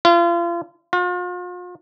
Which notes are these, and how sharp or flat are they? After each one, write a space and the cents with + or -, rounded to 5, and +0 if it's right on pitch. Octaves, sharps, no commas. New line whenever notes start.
F4 -35
F4 +40